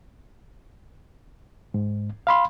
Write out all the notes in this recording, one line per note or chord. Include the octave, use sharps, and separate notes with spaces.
G#2
F5 B5 C6